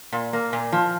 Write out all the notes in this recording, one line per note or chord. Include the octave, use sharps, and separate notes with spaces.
A#2
A#3
A#2
F3